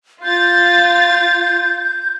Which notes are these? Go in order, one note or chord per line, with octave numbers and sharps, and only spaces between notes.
F4 G6 A6